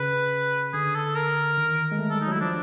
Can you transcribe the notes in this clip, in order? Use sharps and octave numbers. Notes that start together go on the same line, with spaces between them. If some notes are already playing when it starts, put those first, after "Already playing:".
Already playing: C#3 B4
D3 G#4
A4
A#4
D#3
G#3
A3
G3 A4
D#4
F#3
E4
F3 D4